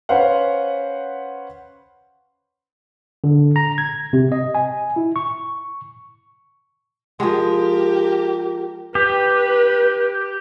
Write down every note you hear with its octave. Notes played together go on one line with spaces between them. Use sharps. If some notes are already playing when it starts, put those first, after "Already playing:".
C#4 B4 C5 F5 F#5
D3
A#5
G#6
C3
D#5
G#5
E4
C#6
F3 G#3 G4 A#4
G4 B4